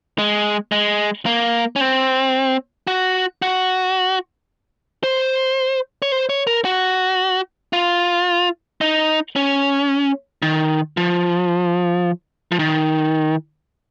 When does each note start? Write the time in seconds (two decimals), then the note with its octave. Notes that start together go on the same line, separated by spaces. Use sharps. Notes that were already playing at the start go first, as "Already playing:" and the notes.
0.19 G#3
0.72 G#3
1.26 A#3
1.76 C#4
1.81 C4
2.87 F#4
3.42 F#4
5.04 C5
6.02 C#5
6.12 C5
6.29 C#5
6.47 A#4
6.65 F#4
7.73 F4
8.81 D#4
9.36 C#4
10.42 D#3
10.97 F3
12.52 F3
12.59 D#3